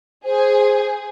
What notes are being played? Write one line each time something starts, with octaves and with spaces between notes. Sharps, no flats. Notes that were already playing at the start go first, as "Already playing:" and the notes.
G#4 C5